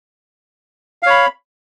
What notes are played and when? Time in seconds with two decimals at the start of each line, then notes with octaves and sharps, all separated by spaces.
1.03 F5
1.06 C#5
1.10 B5